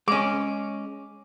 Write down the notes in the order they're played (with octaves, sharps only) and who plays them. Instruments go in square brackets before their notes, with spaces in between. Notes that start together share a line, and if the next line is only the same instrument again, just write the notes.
[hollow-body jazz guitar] G#3 C#4 [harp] D6